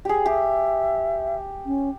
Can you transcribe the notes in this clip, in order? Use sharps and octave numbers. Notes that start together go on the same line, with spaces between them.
G4 G#4
G4 E5
C#4